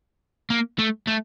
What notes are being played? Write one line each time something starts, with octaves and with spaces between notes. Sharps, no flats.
A#3
A3
A3